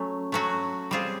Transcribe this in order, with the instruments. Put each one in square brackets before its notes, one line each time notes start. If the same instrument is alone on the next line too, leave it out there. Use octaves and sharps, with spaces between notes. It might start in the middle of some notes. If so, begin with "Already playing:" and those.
Already playing: [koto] F#3 A3 C#4
F#3 A3 C#4 F#4
G3 C4 F4 G#4